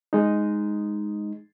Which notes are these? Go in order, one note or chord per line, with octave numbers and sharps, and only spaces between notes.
G#3 D#4